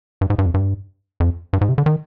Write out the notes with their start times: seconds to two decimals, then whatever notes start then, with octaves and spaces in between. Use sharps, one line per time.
0.21 G2
0.30 G#2
0.38 G2
0.46 F2
0.54 G2
1.20 F2
1.53 G2
1.61 G#2
1.69 C3
1.78 D3
1.86 D#3